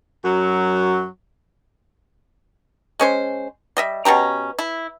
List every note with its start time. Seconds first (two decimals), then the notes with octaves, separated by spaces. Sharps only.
0.23 F#2 F#3
3.00 G#3 C#4 C5
3.77 G3 D#5 E5
4.05 B2 C#4 G4 A#5
4.59 E4